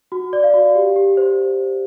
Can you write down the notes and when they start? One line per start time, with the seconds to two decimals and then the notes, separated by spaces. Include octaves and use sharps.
0.12 F#4
0.33 D5
0.44 F5
0.54 F#4
0.75 G4
0.96 G4
1.17 C5